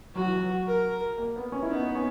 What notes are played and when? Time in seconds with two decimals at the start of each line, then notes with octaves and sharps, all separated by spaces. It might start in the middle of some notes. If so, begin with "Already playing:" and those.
0.15 F#3 F#4
0.25 E3
0.36 F#3
0.67 A#4
1.18 A#3
1.36 B3
1.52 C#4
1.63 E4
1.70 B3 D#4
1.95 C#4